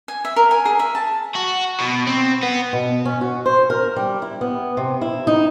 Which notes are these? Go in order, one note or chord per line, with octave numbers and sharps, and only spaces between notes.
G#5
E5
A#4
G#5
G#4
E5
A5
F#4
B2
C4
B3
B2
C#4
F#4
C5
A#4
G3
E4
B3
C3
E4
D#4